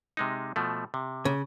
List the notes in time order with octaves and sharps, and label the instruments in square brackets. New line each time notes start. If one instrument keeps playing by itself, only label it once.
[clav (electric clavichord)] C3 G#3 D#4
B2 F3 A3
C3
[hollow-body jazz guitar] C#3